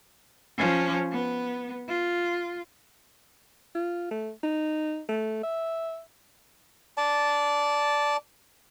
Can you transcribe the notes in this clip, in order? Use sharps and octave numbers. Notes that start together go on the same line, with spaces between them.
F3 C#4
B3
F4
F4
A3
D#4
A3
E5
D5 A5